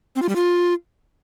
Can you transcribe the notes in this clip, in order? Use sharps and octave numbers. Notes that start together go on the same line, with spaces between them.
C4
F4
G3
F4